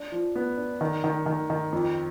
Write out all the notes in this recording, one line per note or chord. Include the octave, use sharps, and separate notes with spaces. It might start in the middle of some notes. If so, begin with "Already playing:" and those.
Already playing: D4
F3
B3
D4
D#3
D#3
D#3
D#3
F2